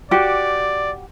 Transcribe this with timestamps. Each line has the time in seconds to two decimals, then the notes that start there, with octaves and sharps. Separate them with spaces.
0.11 F#4 G4 D5